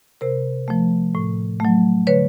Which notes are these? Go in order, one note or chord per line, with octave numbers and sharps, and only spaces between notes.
C3 A#4 C5
F3 A3
A2
F#3 A3
D3 B4 C#5